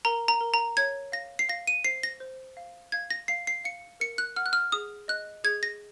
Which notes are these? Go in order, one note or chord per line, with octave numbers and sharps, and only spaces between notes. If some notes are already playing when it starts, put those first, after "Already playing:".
A#4 A#5
A#5
A#4
A#5
C#5 G#6
F5 A#6
C7
F5 A#6
D#7
C5 C7
A#6
C5
F5
F5 G#6
A#6
F5 C7
C7
F5 C#7
A#4 C#7
F#6
F#5 F6
F#6
F6
G#4 D#6
D#5 F#6
G#4 G#6
A#6